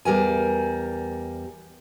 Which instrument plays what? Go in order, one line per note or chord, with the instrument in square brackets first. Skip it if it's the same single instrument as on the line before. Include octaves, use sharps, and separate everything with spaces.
[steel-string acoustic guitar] E2 G3 A#4 G#5